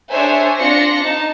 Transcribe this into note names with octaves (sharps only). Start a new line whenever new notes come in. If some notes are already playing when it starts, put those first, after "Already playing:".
D4 G#4 C5 C#5 E5 G#5
C4 D4 F4 C6 A#6 C#7
D#4 A5